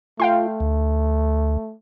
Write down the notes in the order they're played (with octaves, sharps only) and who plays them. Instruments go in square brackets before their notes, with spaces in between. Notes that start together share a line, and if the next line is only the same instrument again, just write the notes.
[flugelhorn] A3 [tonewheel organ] F4 [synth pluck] F5 G5 C6
[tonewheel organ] D2